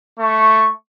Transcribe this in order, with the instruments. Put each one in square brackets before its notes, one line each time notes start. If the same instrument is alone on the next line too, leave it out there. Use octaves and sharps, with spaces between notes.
[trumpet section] A3 C#6